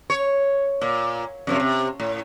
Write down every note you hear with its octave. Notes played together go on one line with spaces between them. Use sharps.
C#5
A#2
F#2 C3 F3
C3
A2